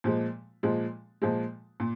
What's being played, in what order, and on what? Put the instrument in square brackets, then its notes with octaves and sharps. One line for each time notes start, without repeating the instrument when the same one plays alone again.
[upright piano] A#2 F3 G#3
A#2 F3 G#3
A#2 F3 G#3
A#2